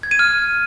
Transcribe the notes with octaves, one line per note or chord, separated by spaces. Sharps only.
G#6
D#7
F6